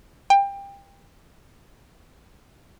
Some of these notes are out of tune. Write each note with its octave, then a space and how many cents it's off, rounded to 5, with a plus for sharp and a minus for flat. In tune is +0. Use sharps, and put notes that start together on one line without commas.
G5 +25